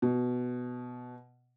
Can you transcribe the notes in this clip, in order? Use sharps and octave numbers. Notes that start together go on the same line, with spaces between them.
B2